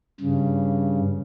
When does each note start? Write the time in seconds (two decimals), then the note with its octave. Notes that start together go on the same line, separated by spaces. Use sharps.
0.21 G2 C#3